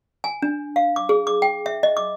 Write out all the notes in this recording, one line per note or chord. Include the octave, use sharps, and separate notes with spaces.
G#5
D4
F5
D6
G#4
D6
G5
E5
D#5
D6